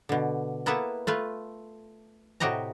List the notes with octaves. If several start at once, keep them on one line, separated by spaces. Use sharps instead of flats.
B2 D3
A#3 B3 E4 A4 B4 E5
A3 F4 B4
A2 C3 F#4 G4 D#5 A#5